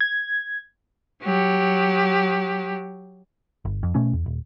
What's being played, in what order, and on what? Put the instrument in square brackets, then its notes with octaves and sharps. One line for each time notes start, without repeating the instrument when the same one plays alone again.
[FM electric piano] G#6
[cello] F#3 G4
[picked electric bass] G1
F2
B2 A3 C#4
E2
D#1